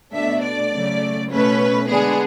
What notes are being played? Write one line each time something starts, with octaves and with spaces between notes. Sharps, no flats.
B2 A3 D4 E5
D5
C#3 F#3 A3
B2 A3 C#4 B4
D3 G#3 B3 D4 G#4